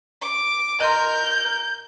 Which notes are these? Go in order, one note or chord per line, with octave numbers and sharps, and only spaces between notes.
D6
A#4 D#5 A#5 C6 G6